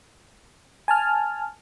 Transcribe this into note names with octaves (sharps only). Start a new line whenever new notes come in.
G#5 A5 F6